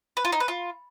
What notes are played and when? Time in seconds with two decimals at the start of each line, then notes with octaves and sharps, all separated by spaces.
0.17 B4
0.25 F4
0.32 D#4
0.40 B4
0.48 F4